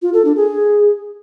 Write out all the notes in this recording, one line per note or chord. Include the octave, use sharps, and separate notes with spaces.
F4
A4
D4
G#4